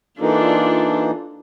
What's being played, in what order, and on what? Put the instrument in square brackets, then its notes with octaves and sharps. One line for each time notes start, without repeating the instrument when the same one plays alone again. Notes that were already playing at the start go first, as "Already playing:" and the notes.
[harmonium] E3 A#3 D#4 [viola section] D4 F4 A4